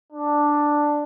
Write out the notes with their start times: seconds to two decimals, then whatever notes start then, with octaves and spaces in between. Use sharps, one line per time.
0.12 D4